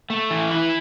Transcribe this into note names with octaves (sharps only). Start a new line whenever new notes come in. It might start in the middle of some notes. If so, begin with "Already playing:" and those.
A3
E3
E4